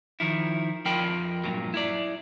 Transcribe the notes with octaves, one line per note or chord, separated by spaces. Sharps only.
D#3 F3 E4
F2 F4 A#4 G5 B5
G2 A#2 F#3
E4 D5